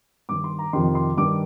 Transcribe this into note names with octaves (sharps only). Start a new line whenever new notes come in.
G2 D#3 D6
C6
A#5
F2 C3 D#3 C6
C6
G2 D#3 D6